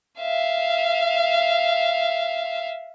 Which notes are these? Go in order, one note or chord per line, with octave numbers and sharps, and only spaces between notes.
E5 F5